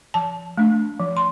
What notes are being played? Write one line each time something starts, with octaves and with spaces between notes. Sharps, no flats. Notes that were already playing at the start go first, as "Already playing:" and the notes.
F3 A5
A3 D4
F3
C6